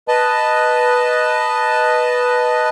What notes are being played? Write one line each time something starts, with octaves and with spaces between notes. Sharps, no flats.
B4 D#5 A5